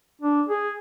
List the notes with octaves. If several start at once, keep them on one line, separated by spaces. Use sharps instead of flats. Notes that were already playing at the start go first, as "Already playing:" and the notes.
D4
G#4